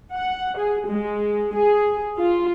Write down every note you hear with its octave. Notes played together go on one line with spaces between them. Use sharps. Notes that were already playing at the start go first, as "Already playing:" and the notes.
F#5
G#4
G#3
G#4
F4